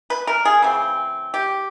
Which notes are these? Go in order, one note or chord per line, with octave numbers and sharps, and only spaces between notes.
B4
A#4
G#4
C#3 E3 A3 C4
G4